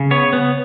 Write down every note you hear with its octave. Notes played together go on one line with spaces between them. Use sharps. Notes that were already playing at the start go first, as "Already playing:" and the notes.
Already playing: C#3
B3 C#5
B3